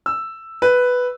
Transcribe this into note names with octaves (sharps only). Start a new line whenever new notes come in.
E6
B4